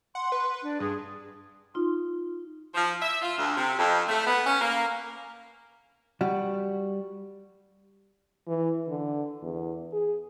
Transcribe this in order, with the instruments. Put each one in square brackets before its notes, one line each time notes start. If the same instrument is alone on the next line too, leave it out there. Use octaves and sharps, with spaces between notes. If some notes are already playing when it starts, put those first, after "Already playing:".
[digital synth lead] F#5 [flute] C6
[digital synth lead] B4
[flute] D4
[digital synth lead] G2 [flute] G#4
[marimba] D#4 F4 C6
[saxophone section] F3
E5
F4
D2
C3
F2
A3
B3
C#4
A#3
[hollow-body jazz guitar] G3 F#4
[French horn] E3
D3
E2
G#4